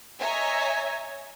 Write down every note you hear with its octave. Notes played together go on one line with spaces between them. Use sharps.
C#5 D#5 E5 G#5 A#5